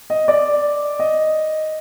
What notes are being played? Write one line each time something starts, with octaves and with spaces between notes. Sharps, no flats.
D#5
D5
D#5